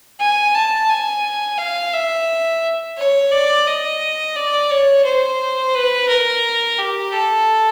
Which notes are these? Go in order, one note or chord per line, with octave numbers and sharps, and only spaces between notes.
G#5
A5
G#5
F5
E5
C#5
D5
D#5
D5
C#5
C5
B4
A#4
G4
A4